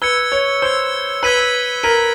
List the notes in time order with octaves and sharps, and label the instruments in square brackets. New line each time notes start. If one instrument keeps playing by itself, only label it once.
[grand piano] B4 [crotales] E6 G#6 C#7
[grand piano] C#5
[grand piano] C5 [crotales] E6 G#6 C#7
[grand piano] B4 [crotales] E6 G#6 B6 D#7 F#7
[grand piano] A#4 [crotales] E6 G#6 B6 D#7 F#7